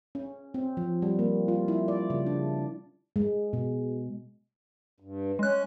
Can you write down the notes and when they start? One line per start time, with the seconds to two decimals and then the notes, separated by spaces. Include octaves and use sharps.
0.15 C#4
0.54 C4
0.77 F3
1.02 G3
1.19 A#3
1.48 F4
1.68 E4
1.88 D5
2.10 C#3
2.26 D4
3.16 G#3
3.53 B2
5.00 G2
5.39 G#3 C#4 F#6